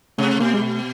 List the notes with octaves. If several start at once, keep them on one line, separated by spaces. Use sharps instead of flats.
C3 A3
B2 A#3
G#3
A3